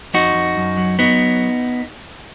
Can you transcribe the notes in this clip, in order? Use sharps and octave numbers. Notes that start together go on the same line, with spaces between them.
F2 D#4 F#4
F2
F#2
F#3
F#3 B3 D#4